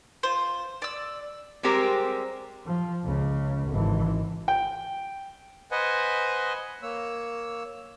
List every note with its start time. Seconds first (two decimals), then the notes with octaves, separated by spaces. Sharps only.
0.23 F4 C5
0.82 D5 E6
1.63 G3 G#3 C4 G4 A#4 C5
2.67 F3
3.05 C#2 C#3
3.69 G#1 E3
4.48 G5
5.71 B4 C5 D#5 F#5 G#5
6.82 A#3 C#5 E6